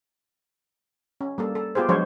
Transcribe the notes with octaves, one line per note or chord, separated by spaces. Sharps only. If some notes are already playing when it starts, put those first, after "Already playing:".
C#4
G3 A#3 A4
A4
B3 F4 G4 G#4 C5
F3 F#3 G#3 D4 C5 C#5